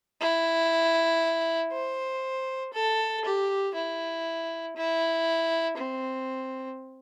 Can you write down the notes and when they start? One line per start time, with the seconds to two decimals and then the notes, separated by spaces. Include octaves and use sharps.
0.21 E4
1.72 C5
2.73 A4
3.25 G4
3.74 E4
4.76 E4
5.77 C4